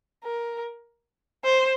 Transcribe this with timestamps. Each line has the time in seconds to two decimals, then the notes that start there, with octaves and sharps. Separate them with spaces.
0.24 A#4
1.45 C5